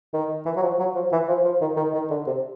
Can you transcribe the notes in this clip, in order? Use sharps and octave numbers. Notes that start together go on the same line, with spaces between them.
D#3
E3
F#3
F3
F#3
F3
E3
F3
F3
D#3
D#3
D#3
D3
C3